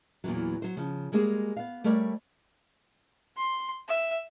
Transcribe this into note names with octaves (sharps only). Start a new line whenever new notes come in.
E2 A#2 C#3 E3 F#3
F#3 C5
C#3 F3
G3 G#3 A#3 G#4 C5
B3 F5
G3 A3 A#4 C#5 D5
C6
E5